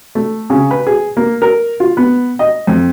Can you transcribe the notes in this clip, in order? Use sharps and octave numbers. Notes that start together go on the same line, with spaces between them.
A3
C#3
B4
G#4
A#3
A#4
F4
B3
D#5
F2